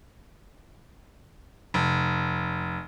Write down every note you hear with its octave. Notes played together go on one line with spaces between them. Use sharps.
F1